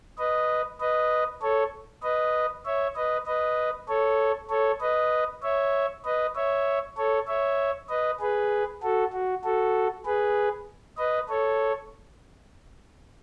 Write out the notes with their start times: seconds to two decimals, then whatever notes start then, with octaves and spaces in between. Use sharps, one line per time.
0.18 B4 D#5
0.81 B4 D#5
1.42 A4 C#5
2.03 B4 D#5
2.66 C#5 E5
2.96 B4 D#5
3.26 B4 D#5
3.88 A4 C#5
4.50 A4 C#5
4.81 B4 D#5
5.42 C#5 E5
6.05 B4 D#5
6.35 C#5 E5
6.97 A4 C#5
7.27 C#5 E5
7.89 B4 D#5
8.20 G#4 B4
8.82 F#4 A4
9.12 F#4
9.44 F#4 A4
10.05 G#4 B4
10.98 B4 D#5
11.28 A4 C#5